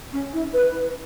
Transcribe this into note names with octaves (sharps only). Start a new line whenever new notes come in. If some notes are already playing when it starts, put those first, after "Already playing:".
C#4
E4
B4